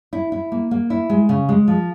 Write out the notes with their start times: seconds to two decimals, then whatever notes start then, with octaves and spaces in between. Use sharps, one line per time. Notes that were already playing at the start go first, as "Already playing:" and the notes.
0.13 E4
0.32 E4
0.52 A#3
0.71 A#3
0.90 E4
1.10 G#3
1.29 C#3
1.49 G#3
1.68 F3